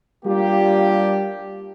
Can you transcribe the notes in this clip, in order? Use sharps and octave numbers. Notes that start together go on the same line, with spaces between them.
G3 A#3 D4 F4 G4